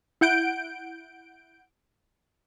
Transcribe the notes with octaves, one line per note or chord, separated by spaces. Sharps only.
E4 F#5 G6 D7